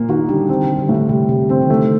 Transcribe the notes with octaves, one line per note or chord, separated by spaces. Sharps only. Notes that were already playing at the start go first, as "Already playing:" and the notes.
Already playing: A#2 A#3
D#3 D#4 F#4
D3 G3 D4
D#3 C4
D3 G3
D3
A2
D3
C3 G3
C3 G3
D3 C4
D#3
D3 A3